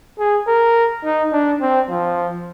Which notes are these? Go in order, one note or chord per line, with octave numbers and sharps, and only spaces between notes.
G#4
A#4
D#4
D4
C4
F3